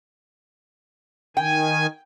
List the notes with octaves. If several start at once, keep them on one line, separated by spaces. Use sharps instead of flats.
D#3 G5 G#5